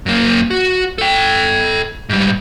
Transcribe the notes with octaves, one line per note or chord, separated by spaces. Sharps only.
F#2 A#3
F#4
A4 G5
G#2 G3